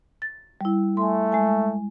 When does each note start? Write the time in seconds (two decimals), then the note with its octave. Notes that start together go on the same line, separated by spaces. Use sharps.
0.22 A6
0.61 G3 E4
0.97 A3 G#5 C6
1.32 G#3 G#5